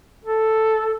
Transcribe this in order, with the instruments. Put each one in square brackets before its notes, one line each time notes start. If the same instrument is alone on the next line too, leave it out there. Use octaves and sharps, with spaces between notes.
[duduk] A4